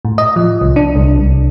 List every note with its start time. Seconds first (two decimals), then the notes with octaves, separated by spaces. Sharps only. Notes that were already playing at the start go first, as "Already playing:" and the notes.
0.05 A2
0.18 D#5
0.36 F3
0.61 C2
0.76 D4
0.95 C2
1.19 C2